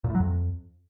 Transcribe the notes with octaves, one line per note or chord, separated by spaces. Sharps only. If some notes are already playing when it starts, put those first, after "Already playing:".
A#2
A2
F#3
F2